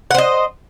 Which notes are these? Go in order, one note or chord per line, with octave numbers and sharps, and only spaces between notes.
C5 D#5 F#5